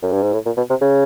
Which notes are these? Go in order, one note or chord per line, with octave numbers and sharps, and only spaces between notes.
F#2
G2
G#2
A2
A#2
B2
C3
C#3